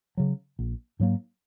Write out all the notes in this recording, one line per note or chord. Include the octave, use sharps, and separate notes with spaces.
C#3 F#3
A#1
G#2 F#3 A#3